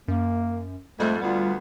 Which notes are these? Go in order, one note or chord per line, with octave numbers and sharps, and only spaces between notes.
F#2 A#3
F2 G#2 G3 A3
D2 B3 F4